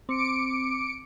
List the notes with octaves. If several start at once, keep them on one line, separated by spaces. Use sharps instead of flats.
C4 D6 C#7 D7